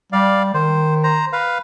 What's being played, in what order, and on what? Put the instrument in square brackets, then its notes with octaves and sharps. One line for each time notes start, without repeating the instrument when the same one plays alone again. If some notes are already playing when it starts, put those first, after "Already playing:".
[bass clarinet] G3 [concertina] D5 F5
[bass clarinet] D#3 [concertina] C5
[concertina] C5 A#5
B4 F5